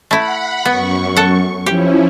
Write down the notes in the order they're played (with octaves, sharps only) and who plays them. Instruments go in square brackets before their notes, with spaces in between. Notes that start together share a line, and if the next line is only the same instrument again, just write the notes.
[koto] A3 E4 [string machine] F#5 B5
[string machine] F#2 C#6 [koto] B3
[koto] A4 F#5
[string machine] F3 C#4 E4 [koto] G4